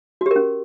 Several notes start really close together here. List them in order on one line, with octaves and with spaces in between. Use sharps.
F#4 G4 A#4 C#4